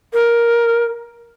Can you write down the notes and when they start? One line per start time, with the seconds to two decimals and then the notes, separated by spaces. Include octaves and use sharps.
0.13 A#4